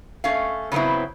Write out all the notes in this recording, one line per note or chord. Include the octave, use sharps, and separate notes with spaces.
A3 C#4 F5
C#3 F#3 B3 C4 E4